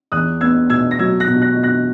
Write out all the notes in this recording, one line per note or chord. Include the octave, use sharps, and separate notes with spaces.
E2 D#6 F#6
B3 E6 G#6
B2 E6 G#6
A#6
F#3 E6 G#6
F#6 A#6
B2
F#6 A#6
B2
F#6 A#6